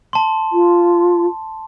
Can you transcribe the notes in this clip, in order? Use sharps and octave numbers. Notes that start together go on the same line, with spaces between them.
A5 C6
F4